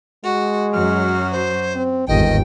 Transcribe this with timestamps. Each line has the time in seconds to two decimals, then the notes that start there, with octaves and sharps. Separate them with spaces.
0.24 G#3 F#4
0.73 F#2 F#3 F#4 F6
1.32 C5
1.75 C4
2.09 G1 D#2 G#2 D#3 D#5 G5